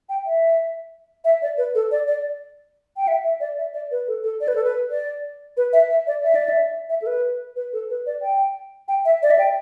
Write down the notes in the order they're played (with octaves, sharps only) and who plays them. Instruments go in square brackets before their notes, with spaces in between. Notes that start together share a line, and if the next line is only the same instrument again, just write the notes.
[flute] G5
E5
E5
D5
B4
A4
D5
D5
G5
E5
E5
D5
E5
D5
B4
A4
A4
D5
B4
A4
B4
D5
B4
E5
E5
D5
E5
D5
E5
E5
A4
B4
B4
A4
B4
D5
G5
G5
E5
D5
E5
G5